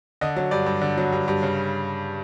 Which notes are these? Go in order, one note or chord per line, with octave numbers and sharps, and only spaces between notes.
D3 D#5
F#3
G2 D5
G2
D3
F#3
G2
G2
C#3